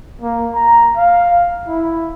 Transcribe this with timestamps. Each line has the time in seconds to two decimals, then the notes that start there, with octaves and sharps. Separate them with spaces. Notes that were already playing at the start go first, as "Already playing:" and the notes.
0.21 A#3
0.55 A#5
0.97 F5
1.68 E4